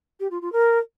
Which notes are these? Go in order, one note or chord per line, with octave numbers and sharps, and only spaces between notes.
G4
F4
F4
A#4